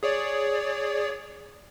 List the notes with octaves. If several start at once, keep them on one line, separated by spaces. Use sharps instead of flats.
G#4 C#5 D5